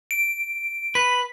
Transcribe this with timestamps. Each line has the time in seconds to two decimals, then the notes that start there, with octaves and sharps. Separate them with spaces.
0.11 D7
0.95 B4 B6